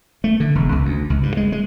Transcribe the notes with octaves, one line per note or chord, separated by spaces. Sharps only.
A3
D3
E1
C#2
D2
C#2
G2
G#3
G#3